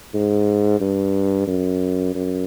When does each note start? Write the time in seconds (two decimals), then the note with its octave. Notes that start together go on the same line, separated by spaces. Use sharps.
0.14 G#2
0.80 G2
1.47 F#2
2.15 F#2